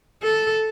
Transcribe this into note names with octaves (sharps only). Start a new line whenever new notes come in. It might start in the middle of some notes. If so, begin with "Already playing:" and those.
A4